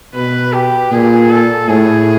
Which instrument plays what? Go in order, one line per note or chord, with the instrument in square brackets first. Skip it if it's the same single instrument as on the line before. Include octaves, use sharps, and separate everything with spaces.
[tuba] B2 [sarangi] B4
[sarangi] G4
[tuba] A#2 [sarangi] G#4
[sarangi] A4
[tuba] A2 [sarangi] G#4